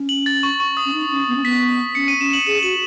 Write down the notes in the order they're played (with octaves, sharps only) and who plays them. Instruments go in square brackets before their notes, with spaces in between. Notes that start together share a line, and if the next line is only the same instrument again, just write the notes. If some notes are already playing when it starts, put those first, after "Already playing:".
Already playing: [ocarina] C#4
[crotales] F#7
A6
C#6
C#6
D#6
[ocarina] C#4
D#4
C#4
B3
C#4
[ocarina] B3 [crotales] B6
[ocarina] C#4 [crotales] C#7
[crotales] D#7
[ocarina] C#4 [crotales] E7
[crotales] F#7
[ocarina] G#4 [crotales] E7
[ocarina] F#4 [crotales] F#7